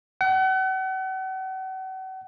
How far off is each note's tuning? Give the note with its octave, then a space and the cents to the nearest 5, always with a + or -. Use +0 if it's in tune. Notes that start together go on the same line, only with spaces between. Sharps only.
F#5 +40